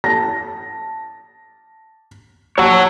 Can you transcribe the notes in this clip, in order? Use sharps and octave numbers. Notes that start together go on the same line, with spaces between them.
A5 A#6
C#5 F#5 A5 C#6 E6